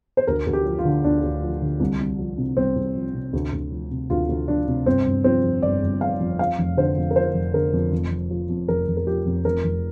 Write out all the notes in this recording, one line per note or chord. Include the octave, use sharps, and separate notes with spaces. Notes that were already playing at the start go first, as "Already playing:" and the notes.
C5
D2 A#4
D2
G4
F3
F4
D3
D2 D4
D2
F3
D3
C2
C2
F3
C3
C2 C4
C2
F3
C3
D2
D2
F3
C3
D2 F4
D2
F3 D4
C3
G1 C4
G1
F3 C4
F2
G1 D5
G1
F3 F5
F2
F3 F5
F1
D3 C5
F2
A#4
F3 C5
F1
D3 A#4
F2
F1
F1
F3
F2
F1 A#4
F1
A#4
F3 G4
F2
F1 A#4
F1